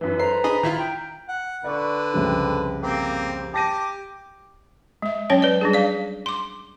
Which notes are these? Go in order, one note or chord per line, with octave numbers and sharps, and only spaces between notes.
F#2 E3 B4
A4 A#4 C5 A#5 C7
D4 G#4 D#5 B5
D#3 E4 F4 F6 B6
G5
F#5
D3 B4 D5 C#6
C2 F2 C#3
A#3 C4 G4
G4 A5 D6 A#6 D#7
G#3 E5
F#3 C#4 C#5 G5
B4 D5
G3 D4 G#4
D5 F5
C6 D6